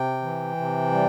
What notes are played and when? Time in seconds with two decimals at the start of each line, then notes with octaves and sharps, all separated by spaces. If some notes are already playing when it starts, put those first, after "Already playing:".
Already playing: C3 G5
0.22 E3
0.56 C3
0.91 G3